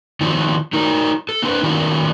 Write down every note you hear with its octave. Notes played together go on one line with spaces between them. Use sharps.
D#3 F3 F#3 C4
F#3 D#4 A#4
A4
C4 D4 B4
D#3 F#3 G3 C#4 A#4